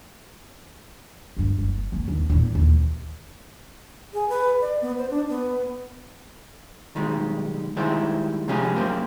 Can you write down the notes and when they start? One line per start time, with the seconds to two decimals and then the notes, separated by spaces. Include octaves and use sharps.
1.37 D2 G2
1.58 F#1
1.92 A#3 C#4
2.08 D#2
2.30 E2 A#2
2.55 D#2 E3
4.14 G#4
4.29 B4
4.61 D5
4.81 B3
4.98 C5
5.10 D4
5.29 B3
6.95 B1 D#3 G3 G#3
7.77 D#3 G3 G#3 E4 C5
8.48 C3 F3 G#3 C#4 G4 G#4
8.75 F#2 A#3 G4 C5